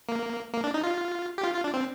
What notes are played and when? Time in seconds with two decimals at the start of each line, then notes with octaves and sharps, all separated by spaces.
0.09 A#3
0.54 A#3
0.64 D4
0.74 D#4
0.84 F4
1.38 G4
1.44 F4
1.54 F4
1.64 D4
1.74 C4